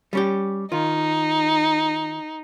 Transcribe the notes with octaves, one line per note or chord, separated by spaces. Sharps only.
G3 C#4 G4
D#3 D#4 F4